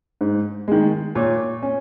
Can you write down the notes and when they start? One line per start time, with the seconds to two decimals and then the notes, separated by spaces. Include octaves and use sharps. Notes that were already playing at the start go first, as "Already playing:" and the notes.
0.21 G#2
0.68 D#3 G#3
1.15 A#2 C#5
1.63 C#4